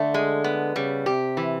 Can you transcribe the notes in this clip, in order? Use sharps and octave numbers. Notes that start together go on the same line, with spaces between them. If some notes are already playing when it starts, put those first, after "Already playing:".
Already playing: D3 A3
G#3
B3
C#3 G3
C3 G4
E3